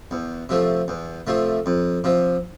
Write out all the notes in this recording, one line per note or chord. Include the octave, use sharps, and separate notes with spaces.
E2
C3 F3 A3
E2
C3 F3 A3
F2
C3 F3